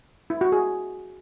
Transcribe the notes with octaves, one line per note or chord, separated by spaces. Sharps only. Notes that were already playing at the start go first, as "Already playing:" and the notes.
E4
F#4
G#4